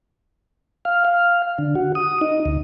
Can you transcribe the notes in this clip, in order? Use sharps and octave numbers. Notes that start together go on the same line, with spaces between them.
F5
F5
D3
F#4
D#6
D#4
D2